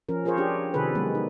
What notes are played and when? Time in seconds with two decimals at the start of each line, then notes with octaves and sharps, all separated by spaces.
0.09 F3 C#4 A#4
0.25 F4 G#4 A#4 C5 C#5
0.37 D4 G4 G#4
0.74 C3 D#3 G#4 A4 B4
0.95 F#3 G#3 B3
1.15 D#4